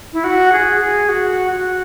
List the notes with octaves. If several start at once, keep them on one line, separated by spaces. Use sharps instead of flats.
E4
F#4
G#4
G#4
F#4
F#4